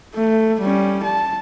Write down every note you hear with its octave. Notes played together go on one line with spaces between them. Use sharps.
A3
G3 C#4
A5